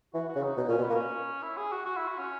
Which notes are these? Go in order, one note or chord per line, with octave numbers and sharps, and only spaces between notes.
E3 F#4
F#4
C#3
D#4
B2 D#4
A#2 C#4
B2
B3
A#3
C#4
E4
G#4
F#4
F#4
E4
F#4
C#4